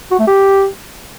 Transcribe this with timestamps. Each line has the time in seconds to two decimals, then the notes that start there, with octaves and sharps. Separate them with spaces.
0.11 F#4
0.19 A3
0.27 G4